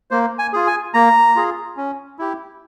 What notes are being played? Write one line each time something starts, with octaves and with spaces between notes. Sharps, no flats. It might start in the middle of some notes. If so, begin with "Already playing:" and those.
A#3 C5
G#5
F4 G#4
G#5
A#3 A#5
F4 G#4
C#4
E4 G4